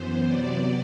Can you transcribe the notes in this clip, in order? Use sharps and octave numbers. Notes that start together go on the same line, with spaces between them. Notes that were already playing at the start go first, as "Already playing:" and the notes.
Already playing: F#2 E3 B3 C5
C3 F#3 B3 D5